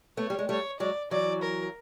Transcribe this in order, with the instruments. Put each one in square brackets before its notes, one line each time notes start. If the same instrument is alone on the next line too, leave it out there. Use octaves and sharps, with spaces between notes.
[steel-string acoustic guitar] A3 B3 [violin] C#5
[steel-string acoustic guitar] G3
G#3
[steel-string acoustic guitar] G3 A3 [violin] C#5
[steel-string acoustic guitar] F#3 G#3 [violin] D5
[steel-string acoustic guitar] E3 F#3 [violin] D5
[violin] A#4